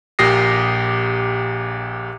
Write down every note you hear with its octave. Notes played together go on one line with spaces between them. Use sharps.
A#1 A#2 G4 D#6 A#6 C7